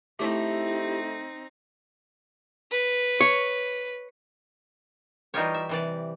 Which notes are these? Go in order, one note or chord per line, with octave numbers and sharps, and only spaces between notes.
A3 C4 D#4 E4 G4
B4
C#5
E3 G3 D#4 F4 G4 C#5
E5
C3 E3 D5